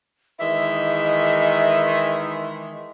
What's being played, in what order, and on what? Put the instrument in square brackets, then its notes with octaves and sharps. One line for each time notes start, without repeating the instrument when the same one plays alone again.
[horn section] D#3 E3 G#3 [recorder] E5